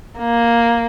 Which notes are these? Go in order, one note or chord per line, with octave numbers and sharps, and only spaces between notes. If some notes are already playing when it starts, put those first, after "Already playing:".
A#3